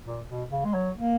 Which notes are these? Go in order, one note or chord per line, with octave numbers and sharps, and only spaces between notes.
A#2
B2
C#3
G#3
F#3
A#3